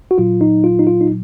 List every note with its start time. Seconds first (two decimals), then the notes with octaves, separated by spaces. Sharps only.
0.11 F#4
0.18 A#2 F#3 F4
0.41 D#4
0.64 F4
0.79 D#4
0.87 F4
1.01 D#4